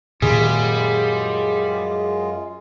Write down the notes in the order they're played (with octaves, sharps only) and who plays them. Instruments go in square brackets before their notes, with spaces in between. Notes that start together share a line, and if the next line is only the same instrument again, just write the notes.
[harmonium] F#2 G#3 F4 [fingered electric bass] A#2 D#3 [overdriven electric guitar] G3 [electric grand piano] G#4